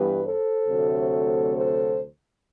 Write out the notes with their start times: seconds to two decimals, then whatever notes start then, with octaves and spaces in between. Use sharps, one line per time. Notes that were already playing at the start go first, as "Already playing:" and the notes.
Already playing: G2 E3 G3 B3 G4 B4
0.25 A4 C5
0.68 D2 C3 F#3 A3
1.55 A4 C5